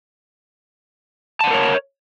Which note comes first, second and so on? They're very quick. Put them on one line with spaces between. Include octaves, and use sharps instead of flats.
A5 F#5 C5 A#4 C#5